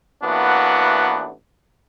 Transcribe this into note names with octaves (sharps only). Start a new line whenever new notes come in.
A1 E3 A#3 B3 D4 F#4